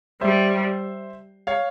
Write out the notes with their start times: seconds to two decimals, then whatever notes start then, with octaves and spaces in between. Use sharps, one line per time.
0.21 G3 C5 E5
1.47 C#5 F5